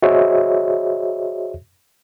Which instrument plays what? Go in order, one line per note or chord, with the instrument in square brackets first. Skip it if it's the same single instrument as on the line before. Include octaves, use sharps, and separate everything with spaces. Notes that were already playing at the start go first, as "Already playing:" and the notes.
[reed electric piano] F#4 G#4 C5 C#5 D#5 E5